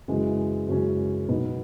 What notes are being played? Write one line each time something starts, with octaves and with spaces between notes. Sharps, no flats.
F#2 C#3 E3 G#3 C#4
F#2 C#3 E3 G#3 C#4
B2 F#3 B3 D#4